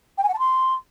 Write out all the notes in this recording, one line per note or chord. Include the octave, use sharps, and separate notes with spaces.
G5
G#5
F#5
A5
C6